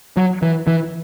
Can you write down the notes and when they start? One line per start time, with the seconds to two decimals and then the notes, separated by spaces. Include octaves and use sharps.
0.17 F#3
0.42 E3
0.67 E3